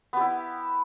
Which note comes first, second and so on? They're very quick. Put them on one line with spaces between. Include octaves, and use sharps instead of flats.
B3 G4 E4